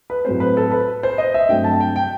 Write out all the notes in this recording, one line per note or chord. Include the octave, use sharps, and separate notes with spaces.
B4
A2 F#3 A3 C4 C5
B4
A4
B4
C5
D#5
E5
G2 F#3 A3 C4 G5
A5
G5
G5